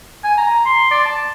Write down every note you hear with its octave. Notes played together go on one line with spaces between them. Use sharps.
G#5
A#5
C6
D5
A5